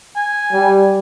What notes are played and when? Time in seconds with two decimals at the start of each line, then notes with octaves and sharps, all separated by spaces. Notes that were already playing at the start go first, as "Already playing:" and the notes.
0.16 G#5
0.52 G3